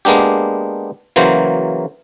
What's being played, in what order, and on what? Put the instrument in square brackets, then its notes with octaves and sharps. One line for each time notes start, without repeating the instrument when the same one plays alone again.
[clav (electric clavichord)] G#3 A#3 B3 D4 G4
C#3 E3 F#3 A#3 C5